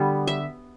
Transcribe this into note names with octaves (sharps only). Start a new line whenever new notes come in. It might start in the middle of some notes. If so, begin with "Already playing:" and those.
Already playing: D3 G3 B3
E5